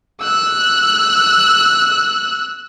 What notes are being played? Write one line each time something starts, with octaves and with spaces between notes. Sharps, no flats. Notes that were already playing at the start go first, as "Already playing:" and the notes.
E6 F#6